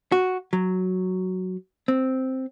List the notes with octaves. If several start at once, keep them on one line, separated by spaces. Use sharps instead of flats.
F#4
F#3
C4